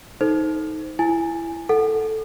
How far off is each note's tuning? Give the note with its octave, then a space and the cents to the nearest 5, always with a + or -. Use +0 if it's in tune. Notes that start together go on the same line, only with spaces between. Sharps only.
D#4 +15 A4 -10 C5 -10
E4 +15 G#5 -5
A4 +0 F#5 -5